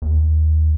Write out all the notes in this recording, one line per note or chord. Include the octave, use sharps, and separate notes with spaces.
D#2